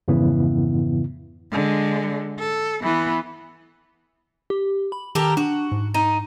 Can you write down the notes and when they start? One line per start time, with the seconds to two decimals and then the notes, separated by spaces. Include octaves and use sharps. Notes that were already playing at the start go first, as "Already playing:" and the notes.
0.08 F2 G#2 C#3 E3 B3 E4
1.51 D3 G#3
2.39 A4
2.83 E3 B3
4.50 G4
4.92 B5
5.15 D#3 G4 A4 A#4
5.37 D4 F#4
5.72 G#2
5.94 D#4